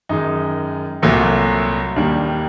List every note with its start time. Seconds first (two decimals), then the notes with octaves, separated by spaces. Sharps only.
0.09 F#2 D#3 G#3 D#4
1.02 C2 A#2 F#3 A3
1.96 D#2 D#3 G3 A#3 D4
2.28 D4